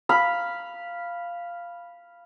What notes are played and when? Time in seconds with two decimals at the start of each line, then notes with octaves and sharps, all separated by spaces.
0.09 F5 B5